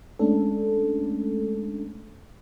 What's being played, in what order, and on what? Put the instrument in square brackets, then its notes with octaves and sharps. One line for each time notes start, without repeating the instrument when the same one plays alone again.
[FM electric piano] G#3 A3 C#4 D4 A4